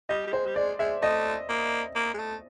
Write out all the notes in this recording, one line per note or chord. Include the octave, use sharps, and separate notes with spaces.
G3 D#5
G3
G#3 C5
G3
G#3 D5
G#3 E5
A3 D#5
A#3
A#3
G#3
A3